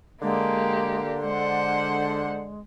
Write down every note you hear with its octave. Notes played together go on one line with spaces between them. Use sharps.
D3 G#3 A#3 G4
G#3 C5 F#5